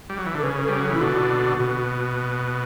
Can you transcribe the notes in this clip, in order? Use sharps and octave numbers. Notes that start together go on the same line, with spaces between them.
G3
F#3
E3
D3
A4
C#3 B4
A4
G3
F#3
E3 E4
B2 D3 F#4
B2